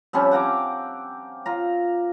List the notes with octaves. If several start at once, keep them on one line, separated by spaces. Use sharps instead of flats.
F3 G3 C4 C#4
F#5 G5 A#5 D6
F4 A#5